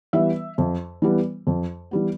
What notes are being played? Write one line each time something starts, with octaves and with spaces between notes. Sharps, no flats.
E3 G3 B3 E5
F2
E3 G3 B3
F2
E3 G3 B3